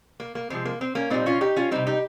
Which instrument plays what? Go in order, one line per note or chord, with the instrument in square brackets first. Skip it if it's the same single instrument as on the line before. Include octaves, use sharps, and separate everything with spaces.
[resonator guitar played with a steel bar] A#3
A#3
C3 F3 G#3 C4
A#3
C4
A#3 C#4
A#2 G3 C4 D#4
C#4 F4
D#4 G4
C#4 F4
C3 G3 C4 D#4
D#4 G4